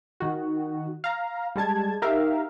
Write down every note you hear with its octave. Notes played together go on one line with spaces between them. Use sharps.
D#3 F#4
F5 A#5
G3 G#3 A5 G#6
D#4 G4 A#4 E5 F5